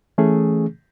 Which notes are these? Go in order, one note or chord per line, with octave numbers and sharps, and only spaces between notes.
E3 A3 C#4 G#4